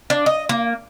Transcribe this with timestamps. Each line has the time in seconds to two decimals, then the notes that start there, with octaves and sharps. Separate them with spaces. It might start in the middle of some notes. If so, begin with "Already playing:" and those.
0.10 D4
0.26 D#5
0.49 A#3